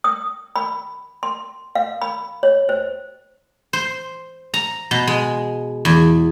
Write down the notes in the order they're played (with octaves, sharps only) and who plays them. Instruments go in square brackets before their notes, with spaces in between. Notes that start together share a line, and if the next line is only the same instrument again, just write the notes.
[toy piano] D#6
B5
C6
F5
B5
C#5
C5
[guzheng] C5
A#5
B2
G#3
E2